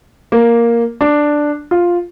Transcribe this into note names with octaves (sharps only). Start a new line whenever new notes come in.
A#3
D4
F4